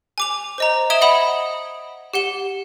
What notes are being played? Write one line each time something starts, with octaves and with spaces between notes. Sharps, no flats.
G#5 D6 F7
C5 D#5 A#5
E5 D#6 G#6 D7 E7 G7
D#5 F#5 B5 D#6
G4 F#5 G7